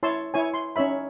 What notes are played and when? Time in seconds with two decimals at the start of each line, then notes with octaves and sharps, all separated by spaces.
0.03 E4 C#5 A5 C6 E6
0.34 E4 C#5 G#5
0.54 C6
0.76 C#4 D#4 C#5 E5 B5